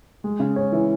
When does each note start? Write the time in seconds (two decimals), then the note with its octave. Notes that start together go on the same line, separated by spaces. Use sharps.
0.24 G#3
0.40 C#3
0.56 C#4
0.72 E3